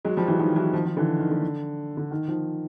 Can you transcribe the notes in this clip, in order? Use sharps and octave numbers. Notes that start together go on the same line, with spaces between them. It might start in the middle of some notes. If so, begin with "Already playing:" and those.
F#3 G#3
F3 G3
E3 F#3
D#3 F3
E3 F#3
D#3 F3
D#3 F3
D3 E3
D#3
D3
D3
D#3
D#3 F3